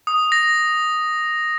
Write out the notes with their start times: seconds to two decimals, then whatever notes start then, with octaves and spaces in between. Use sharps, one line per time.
0.07 D#6
0.32 A#6